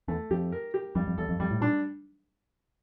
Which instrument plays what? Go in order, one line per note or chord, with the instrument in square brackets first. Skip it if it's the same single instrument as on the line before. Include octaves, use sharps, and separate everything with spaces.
[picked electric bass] E2 [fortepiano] A3
[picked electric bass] F2 [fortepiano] G4
[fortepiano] A#4
G4
[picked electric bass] F2 [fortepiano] G3
[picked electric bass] F2
[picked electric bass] E2 [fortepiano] A4
[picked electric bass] F2
[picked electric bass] F2 [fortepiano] G3
[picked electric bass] A2
[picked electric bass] A#2 [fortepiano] D4